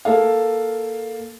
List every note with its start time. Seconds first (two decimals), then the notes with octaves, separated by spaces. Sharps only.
0.05 A#3 A4 F5